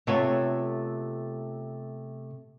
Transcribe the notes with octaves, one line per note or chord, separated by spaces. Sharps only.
C3 A3 B3 F4 C#5 E5